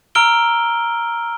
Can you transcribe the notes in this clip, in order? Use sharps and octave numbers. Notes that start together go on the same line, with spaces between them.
A#5 E6 F6 D7 G7